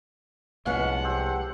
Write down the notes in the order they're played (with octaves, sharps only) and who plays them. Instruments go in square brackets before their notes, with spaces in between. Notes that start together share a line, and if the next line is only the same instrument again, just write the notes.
[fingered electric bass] C2 [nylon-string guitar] F3 G#3 B3 [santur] C#4 [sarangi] F#5
[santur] G4 C5 E6